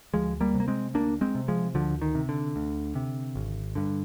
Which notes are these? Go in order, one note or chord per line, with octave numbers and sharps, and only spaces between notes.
D2 F3 G#3
G3 A#3
C3
A#3
G#3 C4
D2 A#3 D4
G#3 C4
C3
F3 G#3
D2 D3 F3
D#3
C3
D3
D2
C3
G#1
G2 D3